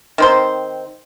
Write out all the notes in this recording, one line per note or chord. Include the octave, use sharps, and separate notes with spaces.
D#3 C4 C5